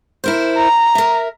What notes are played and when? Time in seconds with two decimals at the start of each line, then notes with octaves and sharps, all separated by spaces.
0.24 E4 A#4 C5
0.57 A#5
0.95 A#4 E5